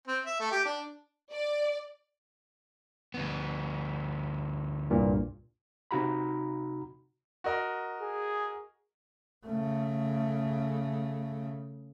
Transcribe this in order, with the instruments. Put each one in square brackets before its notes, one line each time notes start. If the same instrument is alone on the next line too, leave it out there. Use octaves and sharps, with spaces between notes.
[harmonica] C4
E5
A3
G4
D4
[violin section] D5
[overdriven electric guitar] D2 B3
[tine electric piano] C2 G2 A#2
[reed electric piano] C3 D#4 F#4 A#5 B5
[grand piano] F#4 A#4 D#5
[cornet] G#4
[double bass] C#3 A3